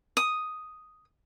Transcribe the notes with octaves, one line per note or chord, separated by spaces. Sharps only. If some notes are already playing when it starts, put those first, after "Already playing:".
D#6